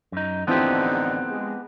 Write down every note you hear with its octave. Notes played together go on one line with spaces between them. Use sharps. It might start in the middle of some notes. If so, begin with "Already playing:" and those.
F#2 D#4
A1 D3 F3 B3 C4 D#4 E4 G4
G#3